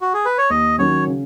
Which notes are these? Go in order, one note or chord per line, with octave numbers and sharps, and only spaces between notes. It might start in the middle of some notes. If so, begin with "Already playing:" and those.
F#4
G#4
B4
C#5
D#2 D#5
D#3 F#3 C#4 C#5
C#3